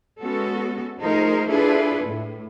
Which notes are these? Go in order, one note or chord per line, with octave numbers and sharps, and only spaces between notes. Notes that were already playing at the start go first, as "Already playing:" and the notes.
G#3 B3 C#4 F#4 A4
F3 A3 D#4 G#4 A#4 C5
D4 E4 F4 G#4 A4 B4
A2